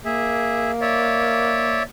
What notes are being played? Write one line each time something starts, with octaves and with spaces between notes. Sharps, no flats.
A#3 G#4 E5
C#5 D5 E5